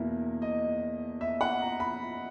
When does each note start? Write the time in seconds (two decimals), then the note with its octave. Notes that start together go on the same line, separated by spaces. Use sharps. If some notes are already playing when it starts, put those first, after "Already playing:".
Already playing: E2 B2 A#3 E4
0.42 D#5
1.21 E5
1.41 F#5
1.61 A#5
1.80 B5